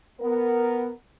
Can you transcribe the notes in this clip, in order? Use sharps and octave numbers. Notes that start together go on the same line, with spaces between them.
B3 A#4